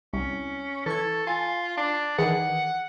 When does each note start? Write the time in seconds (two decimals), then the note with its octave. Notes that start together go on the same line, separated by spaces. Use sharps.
0.13 C2 C#4
0.86 E3 A4 C#6 G#6
1.27 F4 G#5
1.77 D4
2.18 D#3 E3 G#4 F#5